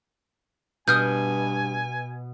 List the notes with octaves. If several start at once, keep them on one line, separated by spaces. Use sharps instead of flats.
G2 B2 G#5 D#6 F6 G6